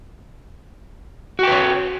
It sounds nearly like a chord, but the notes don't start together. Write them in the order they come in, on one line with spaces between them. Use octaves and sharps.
F#4 G5 B4 C#5